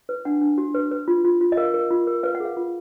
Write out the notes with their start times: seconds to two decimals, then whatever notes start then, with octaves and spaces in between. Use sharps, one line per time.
0.09 B4
0.25 D4 F#5
0.41 D4
0.58 F#4
0.74 B4
0.91 B4
1.08 F4
1.25 F4
1.41 F4
1.52 D#5
1.57 A#4 F5
1.74 A#4
1.91 F4
2.07 A#4
2.23 B4 F5
2.35 F#5
2.40 G#4 F5
2.57 F4